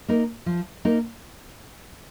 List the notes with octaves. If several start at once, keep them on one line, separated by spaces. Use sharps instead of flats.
A#3 D#4 A#4
F3
A#3 D#4 A#4